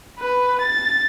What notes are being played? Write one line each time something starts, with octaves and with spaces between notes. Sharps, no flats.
B4
A6